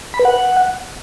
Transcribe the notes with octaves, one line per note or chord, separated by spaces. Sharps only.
B5
B4
F#5